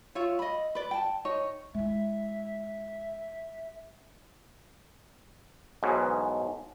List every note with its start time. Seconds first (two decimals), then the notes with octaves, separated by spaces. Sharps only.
0.15 F4 C#5 E5
0.39 D#5 B5
0.75 B4 D5
0.91 G5 A5
1.25 D#4 C#5
1.74 G#3 E4 E5
5.83 B1 G#2 B2 E3